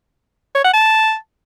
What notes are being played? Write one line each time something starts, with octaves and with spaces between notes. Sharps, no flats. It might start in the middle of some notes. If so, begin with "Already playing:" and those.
C#5
F#5
A5